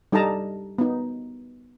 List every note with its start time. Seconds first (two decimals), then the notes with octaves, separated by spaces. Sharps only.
0.12 G3 D#4 A4 D#5 A5 A#5
0.78 B3 D#4